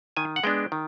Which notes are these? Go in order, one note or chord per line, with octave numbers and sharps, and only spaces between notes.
D#3 G#5
F#5
G#3 B3 D4 G5
D#3